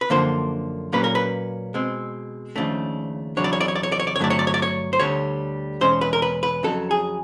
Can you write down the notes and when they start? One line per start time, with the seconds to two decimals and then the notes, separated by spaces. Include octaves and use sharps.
0.01 B4
0.10 F#2 D3 F3 A#3 C5
0.92 A#2 F#3 A#3 C#4 B4
1.04 A#4
1.15 B4
1.74 B2 G#3 C4
2.56 D#2 C#3 F3 A3 D4
3.37 E2 C#3 F#3 D4 C#5
3.44 D5
3.53 C#5
3.61 D5
3.68 C#5
3.76 D5
3.83 C#5
3.92 D5
4.00 C#5
4.07 D5
4.16 C#5
4.19 G2 D3 F#3 A3 D4 D5
4.30 C#5
4.39 D5
4.47 C#5
4.54 D5
4.62 C#5
4.93 C5
5.00 D2 D3 G3 C#5
5.81 E2 B2 G#3 C#4 C5
6.01 B4
6.13 A#4
6.22 B4
6.43 B4
6.63 F2 C#3 F#3 A4
6.91 G#4